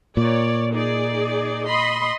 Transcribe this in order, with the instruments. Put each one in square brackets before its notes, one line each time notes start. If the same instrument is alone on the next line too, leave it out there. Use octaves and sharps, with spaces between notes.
[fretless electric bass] A#2 [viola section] C#5 D5
[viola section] D#4 G#4 D5
D#5 B5 C6